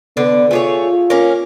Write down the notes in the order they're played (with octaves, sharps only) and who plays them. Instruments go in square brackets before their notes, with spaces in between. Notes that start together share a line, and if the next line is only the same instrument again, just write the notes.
[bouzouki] D3 [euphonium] B3
[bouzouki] A3 G#4 C#5 [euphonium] F4
[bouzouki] A#3 C#4